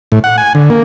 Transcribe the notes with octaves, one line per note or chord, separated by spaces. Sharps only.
A2
F#5
G#5
D3
A#3